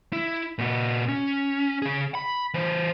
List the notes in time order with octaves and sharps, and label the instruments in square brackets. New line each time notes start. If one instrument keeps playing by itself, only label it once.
[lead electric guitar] E4
A#2 F#4
C#4
C#3 G#4
B5
E3 C5